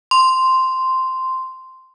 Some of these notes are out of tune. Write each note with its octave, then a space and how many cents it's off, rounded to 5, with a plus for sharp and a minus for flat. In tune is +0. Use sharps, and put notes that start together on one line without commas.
C6 -5